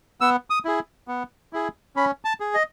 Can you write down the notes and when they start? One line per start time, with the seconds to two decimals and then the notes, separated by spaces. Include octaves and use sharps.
0.21 B3 E6
0.50 D#6
0.65 E4 G#4
1.08 B3
1.53 E4 G#4
1.96 C#4 B5
2.25 A5
2.40 G#4
2.54 D#5